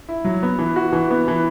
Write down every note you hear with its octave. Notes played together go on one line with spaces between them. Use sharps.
E4
F#3
B3
E3
F#4
E3
B3
E3